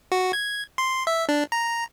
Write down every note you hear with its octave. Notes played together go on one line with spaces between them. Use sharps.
F#4
G#6
C6
E5
D4
A#5